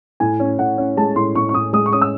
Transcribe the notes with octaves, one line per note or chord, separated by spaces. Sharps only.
A2 G#5
C#4
A2 F#5
C#4
G#3 A5
A2 C6
A2 C#6
C#6
A2 D#6
G#3 D#6
C#6
C#4 D#6
E6